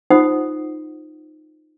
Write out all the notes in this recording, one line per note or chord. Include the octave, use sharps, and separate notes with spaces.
D#4 F4 C5 F#5 D#6